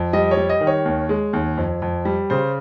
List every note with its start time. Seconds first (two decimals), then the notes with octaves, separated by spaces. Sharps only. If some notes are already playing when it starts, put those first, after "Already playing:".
Already playing: F2
0.13 G3 D#5
0.31 C#5
0.37 G3
0.49 D#5
0.61 D#3
0.67 C#5
0.85 D#2
1.09 G#3
1.33 D#2
1.58 F2
1.82 F2
2.05 G3
2.30 C#3 C5